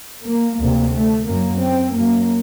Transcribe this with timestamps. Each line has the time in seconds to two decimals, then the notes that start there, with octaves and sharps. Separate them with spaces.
0.25 A#3
0.59 D2 C3 A#3
0.94 A3
1.26 F#2 A#3
1.62 C4
1.94 F#2 A#3